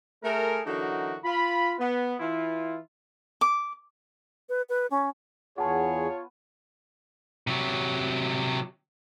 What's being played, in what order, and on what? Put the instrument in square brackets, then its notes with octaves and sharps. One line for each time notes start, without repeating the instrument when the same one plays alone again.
[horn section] A3 G#4 A#4
D3 E3 F#3 D#4 F#4 A#4
F4 B5
B3
E3 E4 F4
[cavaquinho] D6
[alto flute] B4
B4
C#4
[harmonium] E2 G#4 [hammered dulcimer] B3 [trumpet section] F4 C#5 [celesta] F#5 A5
[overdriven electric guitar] C3 F#3